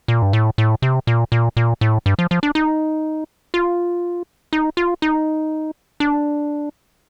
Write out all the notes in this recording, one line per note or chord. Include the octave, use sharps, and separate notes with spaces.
A#2
G2
A2
A2
C3
A#2
A#2
A#2
A2
G2
F3
F3
D4
D#4
F4
D#4
F4
D#4
D4